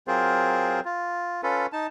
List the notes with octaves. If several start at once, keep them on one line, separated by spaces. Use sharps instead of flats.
F#3 C4 F4 G#4 A#4 C5
F4
C#4 F4 A4 B4
D#4 A5